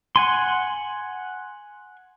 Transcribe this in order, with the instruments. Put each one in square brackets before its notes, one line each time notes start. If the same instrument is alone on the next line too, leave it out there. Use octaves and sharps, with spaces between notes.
[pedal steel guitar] F#5 G#5 C6